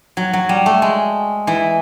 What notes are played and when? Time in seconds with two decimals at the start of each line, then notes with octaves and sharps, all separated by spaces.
0.17 F#3
0.33 F#3
0.49 G3
0.66 A3
0.82 G#3
1.47 E3